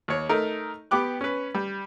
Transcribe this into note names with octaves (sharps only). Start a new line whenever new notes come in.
D#2 C#5
A3 D#4 A#4
B3 G4 D6 F#6
C#4 B4
G3